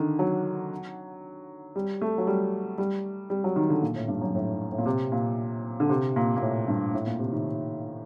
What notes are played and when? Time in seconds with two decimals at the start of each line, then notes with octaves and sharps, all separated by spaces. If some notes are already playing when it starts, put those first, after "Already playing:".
Already playing: D3 D#3
0.19 F#3
1.76 G3
2.01 A3
2.18 F#3
2.27 G3
2.78 G3
3.30 G3
3.44 F#3
3.56 D#3
3.69 D3
3.82 A#2
3.95 A2
4.08 G2
4.21 F#2
4.35 A2
4.72 A2
4.78 A#2
4.86 C3
5.12 A#2
5.80 D3
5.89 C3
6.16 A#2
6.37 A#2
6.42 A2
6.68 G2
6.94 A2
7.06 A#2
7.19 C3
7.32 D#3